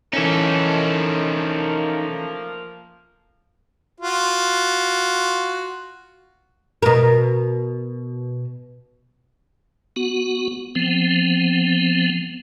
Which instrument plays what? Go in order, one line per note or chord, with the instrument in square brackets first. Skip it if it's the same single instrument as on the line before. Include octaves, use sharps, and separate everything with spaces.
[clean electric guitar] E3 C#4 [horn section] F3 A#3 [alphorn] A3 [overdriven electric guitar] D#4 A4
[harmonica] F4 F#4
[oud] B2 A#4
[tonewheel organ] B3 F#4
F3 B3 C4